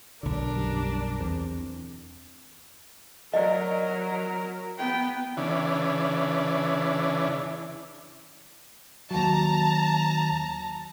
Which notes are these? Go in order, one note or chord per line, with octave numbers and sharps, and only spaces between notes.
B1 D3 D4 A#4
F#2 G3 G4
E2 C4
F#3 A#4 D5 D#5
B3 G5
C#3 E3 D4
D#2 F#3 A5 A#5